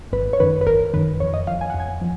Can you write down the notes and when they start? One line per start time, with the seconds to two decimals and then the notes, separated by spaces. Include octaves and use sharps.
0.13 G#1 B4
0.33 C#5
0.40 F#2 D#3 B4
0.61 B4
0.67 G#1 A#4
0.94 F#2 D#3 B4
1.20 F2 C#5
1.34 D#5
1.47 F3 F5
1.61 G#5
1.70 F2 F#5
1.80 G#5
2.01 F3